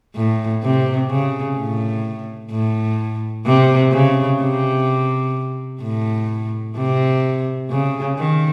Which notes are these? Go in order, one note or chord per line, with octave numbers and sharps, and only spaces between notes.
A2
C3
C#3
A2
A2
C3
C#3
C3
A2
C3
C#3
D#3